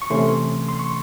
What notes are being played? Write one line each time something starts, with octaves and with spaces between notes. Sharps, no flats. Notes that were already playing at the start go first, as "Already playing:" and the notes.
C#6
C3 E3 A3 C#4 C6
C6
C#6